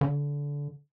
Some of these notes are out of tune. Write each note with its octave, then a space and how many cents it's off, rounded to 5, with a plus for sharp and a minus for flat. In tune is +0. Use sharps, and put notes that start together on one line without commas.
D3 -25